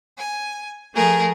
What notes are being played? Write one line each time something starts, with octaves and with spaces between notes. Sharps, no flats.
G#5
F3 A3 G#4 A#4